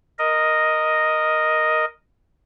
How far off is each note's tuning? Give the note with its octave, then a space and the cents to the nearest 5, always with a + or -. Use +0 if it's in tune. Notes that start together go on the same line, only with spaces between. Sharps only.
A#4 +0 D#5 +0